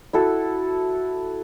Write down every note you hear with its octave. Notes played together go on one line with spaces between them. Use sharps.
E4 F#4 A4